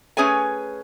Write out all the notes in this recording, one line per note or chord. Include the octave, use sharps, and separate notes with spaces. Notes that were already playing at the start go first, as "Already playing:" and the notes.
A3 C#4 G#4 B4 C#5 G#5